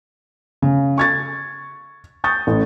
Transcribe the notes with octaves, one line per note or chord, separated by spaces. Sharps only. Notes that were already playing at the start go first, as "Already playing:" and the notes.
C#3
C#6 G#6 A6
C#6 D#6 G6 A6
A1